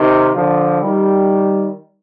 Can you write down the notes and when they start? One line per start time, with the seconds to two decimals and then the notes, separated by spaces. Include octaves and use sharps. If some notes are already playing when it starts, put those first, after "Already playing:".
Already playing: C3 D#3
0.34 D3 F3
0.82 D#3 G3